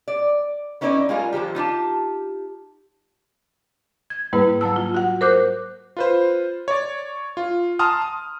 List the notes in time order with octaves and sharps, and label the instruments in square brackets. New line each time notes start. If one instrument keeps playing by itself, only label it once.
[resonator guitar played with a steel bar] D5
B3 C#4 D#4 E4 C5 D5
G3 G#3 D#4 F4 G#4 A#4
D3 D#3 F3 G4
D#4 F4 G4 A5
[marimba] G#6
G#2 G3 A#3 E4 B4
F#3 A#3 A5 E6
F4
F#4 F#5
A#4 C5 D6 F#6 G6
[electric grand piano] F4 B4 C5
C#5 D5
F4
A5 A#5 C6 D#6 F6
D#6